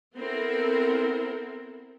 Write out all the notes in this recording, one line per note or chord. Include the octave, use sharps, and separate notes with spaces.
B3 C4 E4 A4 A#4